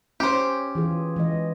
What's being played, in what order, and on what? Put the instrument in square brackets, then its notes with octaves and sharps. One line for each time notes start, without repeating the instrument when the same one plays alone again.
[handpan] C#4 [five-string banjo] G4 C5
[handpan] E3 F4 G#4
E3 G#3 D#5